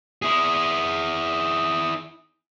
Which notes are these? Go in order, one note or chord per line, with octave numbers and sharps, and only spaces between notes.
E4 G#4